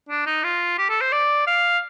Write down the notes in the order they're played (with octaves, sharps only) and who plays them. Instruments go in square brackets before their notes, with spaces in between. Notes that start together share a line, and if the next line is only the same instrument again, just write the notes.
[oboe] D4
D#4
F4
G4
A4
C5
D5
F5